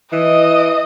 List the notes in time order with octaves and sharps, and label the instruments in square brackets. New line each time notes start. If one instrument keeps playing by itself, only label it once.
[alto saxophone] E3 [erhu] D#5